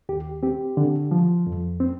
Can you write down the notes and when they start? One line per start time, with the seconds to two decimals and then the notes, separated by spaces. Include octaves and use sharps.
0.09 D#2 G4
0.43 C4 G4
0.77 D3
1.11 F3
1.47 F2
1.80 C4